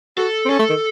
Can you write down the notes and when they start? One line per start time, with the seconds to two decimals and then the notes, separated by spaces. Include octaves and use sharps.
0.17 F#4 A4
0.45 C4
0.49 C#4 A4
0.59 A3
0.69 D#3